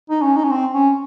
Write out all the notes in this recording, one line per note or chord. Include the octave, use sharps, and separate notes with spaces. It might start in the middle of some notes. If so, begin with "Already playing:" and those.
D#4
C#4
D#4
C#4
C4
C#4